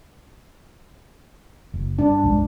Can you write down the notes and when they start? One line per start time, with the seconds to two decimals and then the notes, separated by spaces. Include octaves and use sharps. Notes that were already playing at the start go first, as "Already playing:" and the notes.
1.74 F#1
1.99 G2 D4
2.24 B1 F#2 G#3